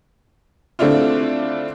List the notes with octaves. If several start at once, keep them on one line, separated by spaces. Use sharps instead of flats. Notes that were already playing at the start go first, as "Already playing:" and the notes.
D3 A3 C4 D4 E4 F4